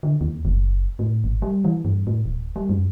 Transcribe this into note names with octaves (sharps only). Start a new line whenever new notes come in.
D3
D#2
F#1
A2
G#1
G3
E3
G2
A2
D1
G3
F#2